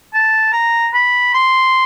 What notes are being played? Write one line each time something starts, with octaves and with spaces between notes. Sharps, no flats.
A5
A#5
B5
C6